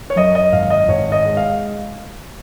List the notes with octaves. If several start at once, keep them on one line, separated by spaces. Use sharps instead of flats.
C#5
F#2 D#5
D#5
G#1 F5
D#5
G#1 C#5
D#5
G#3
F5